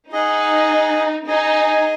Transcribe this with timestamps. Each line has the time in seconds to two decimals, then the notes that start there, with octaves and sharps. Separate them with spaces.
0.11 D#4 G#4 D#5 F#5
1.26 D#4 G#4 D#5 G#5